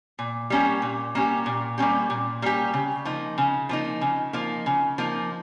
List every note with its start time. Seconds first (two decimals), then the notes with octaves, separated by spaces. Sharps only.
0.19 A#2
0.50 G3 A#3 C#4 G4
0.82 A#2
1.15 G3 A#3 C#4 G4
1.46 A#2
1.78 G3 A#3 C#4 G4
2.10 A#2
2.42 G3 A#3 C#4 G4
2.73 C#3
3.05 F3 A#3 D#4
3.38 C#3
3.69 F3 A#3 D#4
4.01 C#3
4.33 F3 A#3 D#4
4.66 C#3
4.98 F3 A#3 D#4